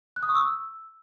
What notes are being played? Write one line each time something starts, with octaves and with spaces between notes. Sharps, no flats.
F#6
D#6
C#6
E6